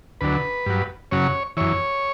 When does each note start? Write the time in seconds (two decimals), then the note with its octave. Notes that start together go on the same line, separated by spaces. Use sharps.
0.21 D2 D3 F#3 B4
0.66 G2 F#3
1.11 F#2 C#3 F#3 C#5
1.57 F#2 E3 C#5